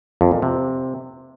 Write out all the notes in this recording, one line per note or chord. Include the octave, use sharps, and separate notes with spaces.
F2
A#2
C3